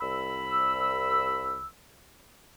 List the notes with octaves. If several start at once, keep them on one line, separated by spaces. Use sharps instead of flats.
C2 B5 E6